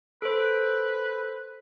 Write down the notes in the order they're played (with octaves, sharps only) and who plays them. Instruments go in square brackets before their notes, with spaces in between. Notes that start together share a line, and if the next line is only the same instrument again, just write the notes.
[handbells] A4 C5 [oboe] B4